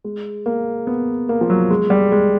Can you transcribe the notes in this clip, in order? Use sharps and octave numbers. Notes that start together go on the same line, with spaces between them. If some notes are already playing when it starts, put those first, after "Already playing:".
G#3
A#3
B3
A#3
F3
F#3
G#3
G3
G#3